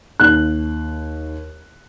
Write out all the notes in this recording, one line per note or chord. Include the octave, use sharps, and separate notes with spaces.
D#2 F#6